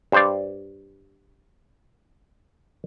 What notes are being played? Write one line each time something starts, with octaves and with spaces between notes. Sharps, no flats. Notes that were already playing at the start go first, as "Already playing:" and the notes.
G2 C5 D5